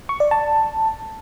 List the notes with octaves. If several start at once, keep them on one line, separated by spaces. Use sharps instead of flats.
C#6
D5
A5